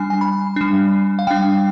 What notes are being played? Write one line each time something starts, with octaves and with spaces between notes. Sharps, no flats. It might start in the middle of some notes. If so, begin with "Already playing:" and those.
Already playing: G3 D4 G#5
G#5
B5
G3 D4
F5
G3 D4 G5